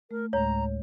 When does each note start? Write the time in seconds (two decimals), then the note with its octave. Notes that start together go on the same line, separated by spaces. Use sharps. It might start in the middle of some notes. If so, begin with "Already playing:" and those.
0.11 A3 A#4
0.33 D2 A2 G#3 C#5 A#5